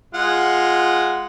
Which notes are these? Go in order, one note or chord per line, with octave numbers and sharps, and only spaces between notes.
G#3 F4 F#5